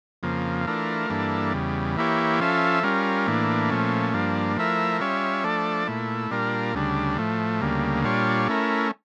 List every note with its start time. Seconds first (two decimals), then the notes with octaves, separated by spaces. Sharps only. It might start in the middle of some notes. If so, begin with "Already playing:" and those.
0.23 F2 C#3 F3 A#3
0.67 E3 A3 D4 F4 A#4
1.10 G2 E3 A#3 D4 A4
1.53 E2 C#3 G3
1.97 E3 A#3 E4 G4 C#5
2.40 F3 C#4 F4 A4 E5
2.83 G3 C#4 F4 A#4
3.27 A2 E3 A#3 D4
3.70 A#2 F3 A3 C#4
4.14 G2 F3 A#3 D4
4.57 F3 A3 E4 A#4 E5
5.00 G3 C#4 F4 C#5 E5
5.44 F3 A3 D4 A4 D5
5.87 A#2 A3 E4
6.31 A#2 G3 D4 F4 A#4
6.74 D2 C#3 G3 D4
7.18 A2 F3 A3
7.61 D2 C#3 G3 A#3
8.04 A#2 G3 D4 F4 C#5
8.48 A3 C#4 E4 A#4